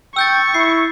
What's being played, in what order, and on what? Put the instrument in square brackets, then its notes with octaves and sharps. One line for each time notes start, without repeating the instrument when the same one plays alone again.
[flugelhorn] G5 [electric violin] C#6 [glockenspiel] E6 G6 A6
[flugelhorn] E4 [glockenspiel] C7